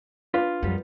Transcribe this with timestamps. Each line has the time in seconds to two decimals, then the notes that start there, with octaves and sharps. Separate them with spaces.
0.34 D4 F4 B4 C6
0.62 F#2 F3 G3 B3